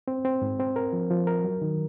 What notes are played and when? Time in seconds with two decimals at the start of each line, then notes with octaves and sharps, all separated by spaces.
0.08 C4
0.25 C4
0.42 G#2
0.59 C4
0.76 A#4
0.93 F3
1.11 F3
1.27 A#4
1.44 F#3
1.62 D#3